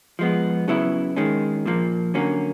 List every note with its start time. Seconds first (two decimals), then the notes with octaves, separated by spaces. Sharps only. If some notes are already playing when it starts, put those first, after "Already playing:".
0.19 F3 G#3 B3
0.68 C#3 F#3 B3 E4
1.16 D#3 G#3 C#4
1.66 A#2 F3 A#3
2.14 D3 F#3 A#3 C#4